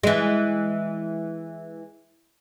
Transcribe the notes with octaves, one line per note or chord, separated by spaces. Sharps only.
E3 G#3